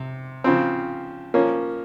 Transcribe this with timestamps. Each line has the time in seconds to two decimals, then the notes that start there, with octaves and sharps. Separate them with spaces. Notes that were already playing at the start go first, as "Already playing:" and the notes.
Already playing: C3
0.44 C#3 F3 C4
1.34 F3 A#3 C#4